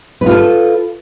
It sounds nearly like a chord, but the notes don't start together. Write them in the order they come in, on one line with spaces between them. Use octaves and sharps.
B4 F4 A4